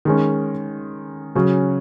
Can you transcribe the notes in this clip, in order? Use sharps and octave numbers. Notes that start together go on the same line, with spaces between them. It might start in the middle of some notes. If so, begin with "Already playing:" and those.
D#3 G#3 C#4
C#3 F#3 C#4 F#4